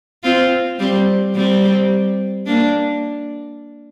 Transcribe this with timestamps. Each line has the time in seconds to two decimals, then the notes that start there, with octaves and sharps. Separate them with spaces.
0.23 C4 F4
0.79 G3 C4
1.36 G3 C4
2.46 A#3 D4